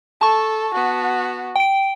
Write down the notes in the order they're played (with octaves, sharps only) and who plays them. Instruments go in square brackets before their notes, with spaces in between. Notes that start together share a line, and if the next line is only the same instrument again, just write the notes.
[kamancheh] A4 [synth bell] A5 C#6
[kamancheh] B3 F#4
[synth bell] G5 D7